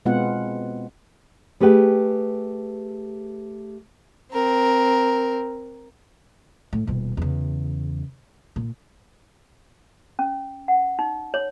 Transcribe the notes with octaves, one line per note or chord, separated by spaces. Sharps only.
B2 G#3 B3 C4 F4 F#5
A3 G4 G#4 B4 G5
C4 A#4
A2
D#1 B2
E2 C#3
A#2
C#4
F#5
D#4
C#5